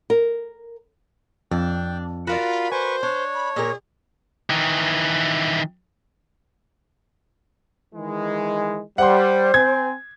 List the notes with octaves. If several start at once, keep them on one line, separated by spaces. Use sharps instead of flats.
A#4
F2 D4 G5
F4 F#4 A#4 D5 B5
B4 C5 G#5 C#6
D4 C#5
B5
A#2 G#4 A#4
D#3 E3
D#3 E3 G#3
G3 C5 F#5 C6
C4 G#5 G#6